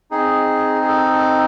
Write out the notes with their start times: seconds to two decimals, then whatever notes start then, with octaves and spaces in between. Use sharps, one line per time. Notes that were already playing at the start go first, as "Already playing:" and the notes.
0.11 C4 D#4 G#4
0.82 G#4
0.87 A4
1.13 A4